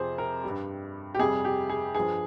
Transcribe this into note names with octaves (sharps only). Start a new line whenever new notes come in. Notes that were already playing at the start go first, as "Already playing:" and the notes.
Already playing: F2 C3 F3 G#4 C5
A#4
G2 G3
G4
F2 C3 G3 G#4
G4
G#4
G2 F3 G#4